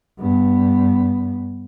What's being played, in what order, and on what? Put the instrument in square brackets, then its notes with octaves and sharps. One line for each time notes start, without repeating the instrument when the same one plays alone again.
[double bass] G2 B3